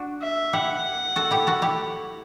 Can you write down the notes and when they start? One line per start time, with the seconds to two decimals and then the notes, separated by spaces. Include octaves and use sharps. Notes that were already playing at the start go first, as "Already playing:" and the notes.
Already playing: D4 F#4
0.22 E5
0.53 E4 G4 F#5
1.16 F#4 A4
1.31 E4 G4
1.47 F#4 A4
1.62 E4 G4